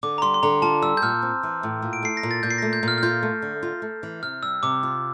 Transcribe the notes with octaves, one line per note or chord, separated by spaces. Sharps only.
D3 D6
A#5
G3 C6
C6
D3 A#5
F4 A5
G3 E6
G6
A#2 F6
C4
E3
A2
A#2
D7
A3 C7
A#6
A#2
A6
A#2 G6
C7
A#6
A3
G6
A#2 F6
F6
F4 G6
A3
D3
F4
A3
E3
C3 F6
G3 E6
C3 D6
F4